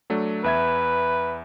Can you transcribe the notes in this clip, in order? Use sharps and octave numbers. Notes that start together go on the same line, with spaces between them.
F#3 A3 D4
E2 B4 E5 G#6